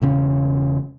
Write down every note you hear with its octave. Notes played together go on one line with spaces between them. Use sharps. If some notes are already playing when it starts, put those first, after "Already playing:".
E1 C#3 C#4